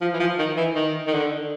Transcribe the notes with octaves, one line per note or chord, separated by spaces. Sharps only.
F3
E3
F3
D#3
E3
D#3
D#3
D3